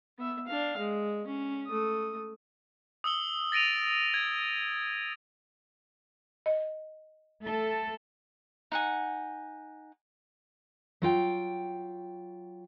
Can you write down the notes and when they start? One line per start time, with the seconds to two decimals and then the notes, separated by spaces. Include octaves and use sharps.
0.18 B3 E5
0.47 D4 F5
0.77 G#3
1.27 C#4
1.66 A3 D#6
3.04 D#6 E6 F#7 G7
3.52 A6 A#6 D7 D#7 F7
4.14 G#6
6.46 D#5
7.44 A3 A4
8.72 D#4 F#5 G#5
11.02 F#3 F4 G5